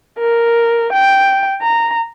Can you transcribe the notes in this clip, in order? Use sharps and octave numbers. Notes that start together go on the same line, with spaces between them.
A#4
G5
A#5